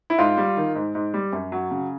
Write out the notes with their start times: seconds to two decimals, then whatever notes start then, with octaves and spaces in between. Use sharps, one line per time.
0.10 E4
0.18 G#2 F4
0.38 G3
0.57 D#3
0.75 G#2
0.95 G#2
1.14 G3
1.33 F#2
1.52 F#3
1.71 C#3